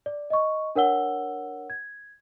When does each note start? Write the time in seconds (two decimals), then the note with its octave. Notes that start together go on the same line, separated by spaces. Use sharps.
0.06 D5
0.30 D#5 C#6
0.75 D4 A#4 C#5 F#5 E6 G7
1.70 G#6